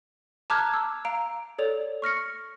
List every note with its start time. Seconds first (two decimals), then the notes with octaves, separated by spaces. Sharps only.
0.50 A5 A#5 D6 F6 F#6 G#6
0.74 E6
1.05 F5 A#5 D7
1.59 A4 C#5 D5 F7
2.02 C#6 F6 A#6 C#7